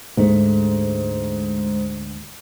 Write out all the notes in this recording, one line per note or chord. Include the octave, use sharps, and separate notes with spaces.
D2 G#2 G#3 A3